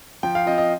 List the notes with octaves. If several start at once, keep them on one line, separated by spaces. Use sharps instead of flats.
F3 G5
F5
C4 F4 D#5
D#5